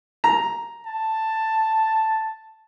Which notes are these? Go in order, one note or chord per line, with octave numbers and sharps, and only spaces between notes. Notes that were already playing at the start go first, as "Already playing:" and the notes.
A#5
A5